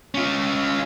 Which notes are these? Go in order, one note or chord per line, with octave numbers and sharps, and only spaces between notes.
C#4 F4